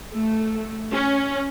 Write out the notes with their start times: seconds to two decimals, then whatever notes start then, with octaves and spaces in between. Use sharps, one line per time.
0.13 A3
0.91 C#4